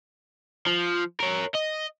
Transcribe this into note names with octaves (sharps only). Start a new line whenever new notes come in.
F3
A#4 C#5
D#5